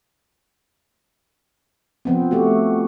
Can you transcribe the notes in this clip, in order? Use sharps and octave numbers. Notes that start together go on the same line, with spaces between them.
F3 B3 C4
A3 F#4 G4